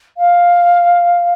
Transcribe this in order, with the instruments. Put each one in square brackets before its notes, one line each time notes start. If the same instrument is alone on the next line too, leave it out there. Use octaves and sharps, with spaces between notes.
[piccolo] F5